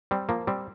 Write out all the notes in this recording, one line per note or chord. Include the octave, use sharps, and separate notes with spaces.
G3 C4
F3 A#3
G3 C4